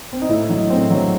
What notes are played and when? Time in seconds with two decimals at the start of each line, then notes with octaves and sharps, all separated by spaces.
0.13 C4
0.22 D#4
0.29 A2 E4
0.49 F#3 D#4
0.70 A2 C4
0.90 F#3